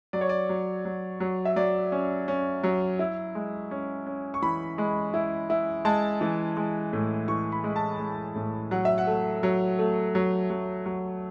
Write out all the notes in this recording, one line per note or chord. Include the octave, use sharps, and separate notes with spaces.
F#3 D5
C#5
D5
F#3
F#3
F#3
E5
F#3 D5
C#4
C#4
F#3
E4
G#3
C#4
C#4
C#6
E3 B5
G#3
E4
E4
G#3 A5
E3
G#3
A2
E3 C#6
B5
G#3
A5
G#3
A2
F#3 F#5
E5
F#5
A3
F#3
A3
F#3
F#3
F#3